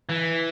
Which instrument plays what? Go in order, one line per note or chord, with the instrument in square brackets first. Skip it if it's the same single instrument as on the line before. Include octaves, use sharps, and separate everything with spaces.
[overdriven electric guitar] E3